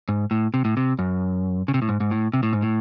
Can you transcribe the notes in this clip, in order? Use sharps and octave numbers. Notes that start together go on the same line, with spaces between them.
G#2
A2
C3
A2
C3
F#2
C#3
C3
A2
G#2
G#2
A2
C3
A2
G#2
A2